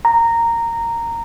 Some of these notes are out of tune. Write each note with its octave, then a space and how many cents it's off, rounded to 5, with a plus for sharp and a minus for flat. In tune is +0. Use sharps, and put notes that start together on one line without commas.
A#5 -10